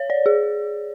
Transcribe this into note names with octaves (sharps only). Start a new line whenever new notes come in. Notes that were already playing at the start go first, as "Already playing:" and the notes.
Already playing: C#5
D5
G#4